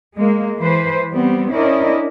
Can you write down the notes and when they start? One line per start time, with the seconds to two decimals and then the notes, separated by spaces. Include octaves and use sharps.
0.14 G#3 A#3
0.60 E3 B4 C5
1.12 G3 B3 C4
1.52 C#4 D4 E4 A#4 D5 D#5